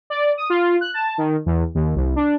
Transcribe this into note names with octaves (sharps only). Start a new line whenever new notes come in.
D5
D#6
F4
F#6
A5
D#3
E2
D#2
C2
D4